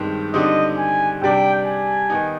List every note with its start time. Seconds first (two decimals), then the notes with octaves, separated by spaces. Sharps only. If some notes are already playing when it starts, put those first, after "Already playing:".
Already playing: G2 D#3 G#3 C4
0.34 D3 G3 C4 D#4 D#5
0.78 G#5
1.22 C3 G3 D4 G5
1.66 G#5
2.10 D#3 B3 D#4